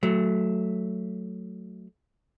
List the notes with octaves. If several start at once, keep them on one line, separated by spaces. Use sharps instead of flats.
F#3 A3